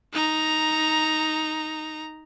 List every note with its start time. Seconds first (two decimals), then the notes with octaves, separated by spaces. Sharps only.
0.13 D#4 A#5